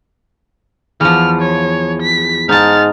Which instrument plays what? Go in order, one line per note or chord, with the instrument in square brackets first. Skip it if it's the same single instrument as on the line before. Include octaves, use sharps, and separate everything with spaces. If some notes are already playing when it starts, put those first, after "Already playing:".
[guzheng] E2 F3 [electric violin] F6
[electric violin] C#5
B6
[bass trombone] G#2 [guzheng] D#4 A5 [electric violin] F6 A6